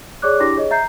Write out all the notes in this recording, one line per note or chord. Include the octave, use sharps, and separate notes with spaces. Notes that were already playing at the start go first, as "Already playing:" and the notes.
G#4 C#5 D5 D6 F#6
D4 E4 G4 D6 A#6
G#4 C#5 D#5
E5 A#5 G6 C7